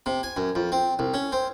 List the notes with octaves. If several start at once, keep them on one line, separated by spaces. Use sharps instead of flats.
C3
G#5
F#2
F2
C4
C2
C#4
C4